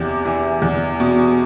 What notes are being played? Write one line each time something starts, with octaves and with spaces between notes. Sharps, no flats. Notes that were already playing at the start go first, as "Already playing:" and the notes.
Already playing: E2 C3
E3
E2
B2